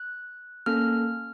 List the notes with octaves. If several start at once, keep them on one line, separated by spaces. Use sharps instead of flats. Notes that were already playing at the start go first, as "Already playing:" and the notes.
Already playing: F#6
A#3 C#4 A4 F6